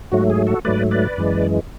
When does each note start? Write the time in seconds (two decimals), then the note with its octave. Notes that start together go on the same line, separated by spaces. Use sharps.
0.12 G#2 F#3 A3 F#4
0.30 G#4
0.47 F#4 A4
0.65 G#2 F#3 A3 B4 D5
0.91 B4 D5
1.18 F#2 E3 G#3